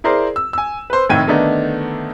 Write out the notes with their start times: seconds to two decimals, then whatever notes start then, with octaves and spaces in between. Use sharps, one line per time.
0.04 E4 G#4 A#4 C5 D5
0.36 E6
0.53 G#5 E6
0.90 B4 C5
1.09 F1 A2 D#3 G5 G#6 D#7
1.27 D3 D#3 A3 B3 D4 D#4